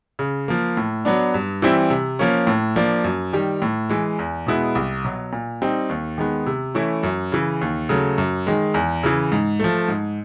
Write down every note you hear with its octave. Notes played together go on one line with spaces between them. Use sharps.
C#3
F3 A#3
A2
F#3 B3 D4
G2
E3 G3 C4 E4
C3
F3 A#3 C#4
A2
F3 A#3 D4
F#2
D#3 G3
A2
E3 G#3
E2
B2 G#3 B3 E4
C2
B2 F#3
A#2
G3 C4 D#4
D#2
D#3 G#3 B3
C3
E3 A3 C#4 E4
F#2
C#3 E3
D#2
C#3 F#3 A3
F#2
D#3 G#3
E2
C#3 E3
G#2
F3 A3
G#2